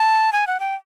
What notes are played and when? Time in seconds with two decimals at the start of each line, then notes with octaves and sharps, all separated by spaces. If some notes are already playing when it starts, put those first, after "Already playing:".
Already playing: A5
0.33 G#5
0.47 F#5
0.60 G5